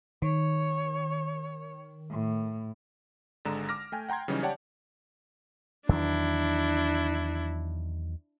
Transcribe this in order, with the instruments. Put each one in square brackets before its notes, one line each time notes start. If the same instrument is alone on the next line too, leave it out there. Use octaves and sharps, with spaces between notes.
[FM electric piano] D#3 [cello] C#5
[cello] A2
[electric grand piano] G#1 D3 G#3 A#5 E7
D6 F6 A#6
A3 G5 G#5
F#5 G5 A#5 C6 G#6
C#3 E3 F#3 G3 C#4 D#4
G4 C#5 D5 F#5 G5 A5
[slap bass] E2 D#3 F#3 [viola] D4 E4